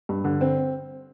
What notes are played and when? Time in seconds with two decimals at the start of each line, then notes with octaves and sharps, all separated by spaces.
0.09 G2
0.24 D3
0.41 C4